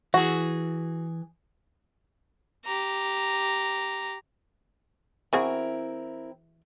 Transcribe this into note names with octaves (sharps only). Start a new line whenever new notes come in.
E3 F#4 G#4
G4 A#5
E3 C4 E4 F#4 G#4 A#4